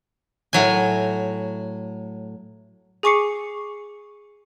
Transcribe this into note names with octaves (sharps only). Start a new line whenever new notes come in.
A2 F#3 G#5
G#4 G#5 C#6 D6 C7 C#7